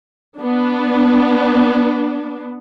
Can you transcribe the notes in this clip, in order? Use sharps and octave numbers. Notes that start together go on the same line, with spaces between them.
B3 D4